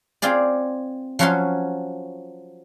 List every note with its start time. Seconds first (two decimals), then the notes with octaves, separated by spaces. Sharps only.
0.22 C4 F4 G#4 D5
1.19 F3 F#3 C#4 F#4 F5 C6